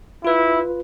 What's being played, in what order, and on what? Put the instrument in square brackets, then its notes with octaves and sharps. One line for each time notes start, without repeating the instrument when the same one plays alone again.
[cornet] E4 [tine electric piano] F4 B4